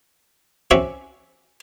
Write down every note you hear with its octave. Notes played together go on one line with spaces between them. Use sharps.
C4 C#4 F#4 E5 D6